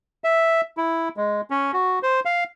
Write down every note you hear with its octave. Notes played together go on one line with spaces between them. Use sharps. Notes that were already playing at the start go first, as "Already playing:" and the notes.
E5
E4
G#3
C#4
F#4
C5
F5